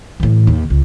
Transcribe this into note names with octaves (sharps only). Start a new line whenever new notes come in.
A2 E3
D#2
C#2